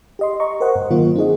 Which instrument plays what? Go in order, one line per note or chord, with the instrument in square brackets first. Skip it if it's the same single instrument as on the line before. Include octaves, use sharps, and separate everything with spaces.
[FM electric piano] G4 D#5 C6
D#5 A#5 C#6
A#4 C5 D#5 F#5
G2
D#3 F#3 A#3 F4 A#4
C4 D#4 G#4 D#5